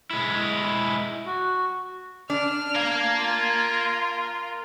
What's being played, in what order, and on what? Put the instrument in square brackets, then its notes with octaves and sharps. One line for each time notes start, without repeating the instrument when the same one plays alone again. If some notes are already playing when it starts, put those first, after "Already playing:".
[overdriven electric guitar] G#3 E4
[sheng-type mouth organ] F#4
[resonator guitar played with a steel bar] D4 [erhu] F6
[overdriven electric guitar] A#4 F5 [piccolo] G#6
[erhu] F4